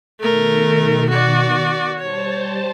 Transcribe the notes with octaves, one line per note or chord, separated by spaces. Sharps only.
B2 D#3 A3 A#4
F#4 D5
G3 C5 C#5 A5